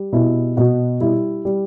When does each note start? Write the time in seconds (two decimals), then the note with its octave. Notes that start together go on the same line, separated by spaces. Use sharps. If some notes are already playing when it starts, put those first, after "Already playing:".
Already playing: G3
0.12 B2 E4
0.57 B2 F#4
1.00 G3 E4
1.45 G3